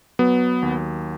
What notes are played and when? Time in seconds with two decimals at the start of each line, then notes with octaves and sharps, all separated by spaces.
0.19 F#3 B3
0.63 D#2